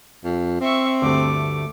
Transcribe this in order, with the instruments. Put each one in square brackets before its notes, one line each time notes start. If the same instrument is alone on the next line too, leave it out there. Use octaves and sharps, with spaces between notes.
[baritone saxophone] F2
[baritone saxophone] C4 [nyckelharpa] E5 C#6
[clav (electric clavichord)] D2 G2 [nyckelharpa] A3 D6